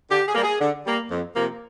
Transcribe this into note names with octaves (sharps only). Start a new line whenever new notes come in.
D3 G4
G#4
G3 A#3
G#4
D3
G3 A#3
F2
C3 F3 A#3